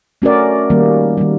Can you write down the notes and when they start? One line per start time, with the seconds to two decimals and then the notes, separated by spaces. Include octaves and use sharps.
0.22 A3 C#4 F#4 A#4 D5
0.70 D#3 G3 A#3
1.17 D#3 G3 A#3